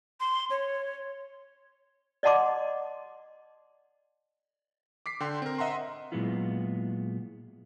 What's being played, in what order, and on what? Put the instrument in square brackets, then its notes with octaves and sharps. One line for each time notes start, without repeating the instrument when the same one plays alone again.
[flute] C6
C#5
[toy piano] D5 D#5 F#5 A5 C6 D6
[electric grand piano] D6 B6 C7
D3 G5 C6
C4 A#4
D#5 E5 F#5 A#5 C6
[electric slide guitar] A#2 F#3 G#3 B3 E4 F4